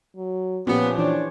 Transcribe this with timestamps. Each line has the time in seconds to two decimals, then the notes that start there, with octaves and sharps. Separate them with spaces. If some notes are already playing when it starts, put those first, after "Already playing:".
0.16 F#3
0.67 A#2 F3 B3 C#4 G4
0.98 E3 D4 F4 C#5